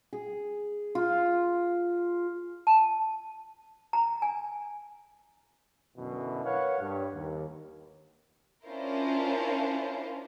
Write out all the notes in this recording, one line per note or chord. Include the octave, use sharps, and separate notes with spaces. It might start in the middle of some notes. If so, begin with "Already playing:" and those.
G#4
F4
A5
A#5
G#5
F#2 B2 D3 E3
A#4 B4 C#5 F5 F#5
G2
D#2
C#4 D4 E4 F4 A#4 C5